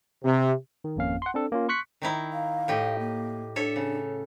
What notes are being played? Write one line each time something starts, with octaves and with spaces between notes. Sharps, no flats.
C3
D#3
G#1 F2 A#3 C#4 F5
F#5 C6
C4 D4 A4
A#3 C#4 F4
C6 C#6 F#6 B6 C#7
D#3 D#4 E4
F5
A2 G4 D#5
A#3
D4 A4 C#5 E5
C#3